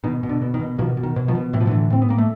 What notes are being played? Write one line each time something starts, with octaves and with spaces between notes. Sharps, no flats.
B2 D#3
B2
D3
B2
D#3
B2
B2 D#3 F3
B2
D#3
B2
D#3 F3
B2
A2 E3
F3
A2 D3 E3
A2 C4
B3
A2 A#3
A3